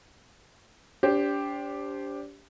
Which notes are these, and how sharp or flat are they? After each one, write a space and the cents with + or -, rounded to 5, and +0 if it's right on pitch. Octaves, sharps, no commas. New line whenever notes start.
D4 -35 G4 +5 C5 +0